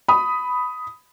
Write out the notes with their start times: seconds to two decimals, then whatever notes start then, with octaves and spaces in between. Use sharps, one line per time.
0.08 B5 D#6